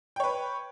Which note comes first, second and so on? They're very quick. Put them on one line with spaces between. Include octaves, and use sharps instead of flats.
G5 C#5 B4